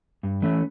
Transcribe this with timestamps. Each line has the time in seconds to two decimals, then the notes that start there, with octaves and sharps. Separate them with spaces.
0.23 G2
0.42 E3 A3 C#4